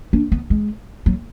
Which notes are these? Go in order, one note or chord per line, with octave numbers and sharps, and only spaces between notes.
D4
B3
G#3
F#3